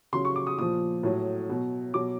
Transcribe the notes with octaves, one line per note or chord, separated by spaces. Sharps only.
C#3 F#3 C6
C#6
D6
D#6
A#2 F3 D#6
A2 F#3
B2 F#3
B2 F#3 D6